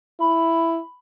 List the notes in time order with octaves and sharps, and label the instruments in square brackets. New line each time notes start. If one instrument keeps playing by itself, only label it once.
[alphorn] E4 [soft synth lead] B5